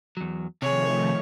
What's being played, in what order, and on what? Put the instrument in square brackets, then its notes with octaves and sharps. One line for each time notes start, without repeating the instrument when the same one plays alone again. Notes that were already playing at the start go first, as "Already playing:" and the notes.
[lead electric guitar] E2 F#3
[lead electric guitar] C3 G#4 [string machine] D#3 F3 A3 [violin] C#5